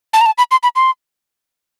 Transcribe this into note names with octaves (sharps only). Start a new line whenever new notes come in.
A5
A#5
A5
B5
C6
B5
C6